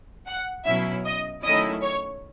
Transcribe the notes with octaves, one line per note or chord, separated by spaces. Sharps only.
F#5
B2 F#3 C#4 E4 E5
D#5
D#3 F#3 A3 C#4 E4 D#5
C#5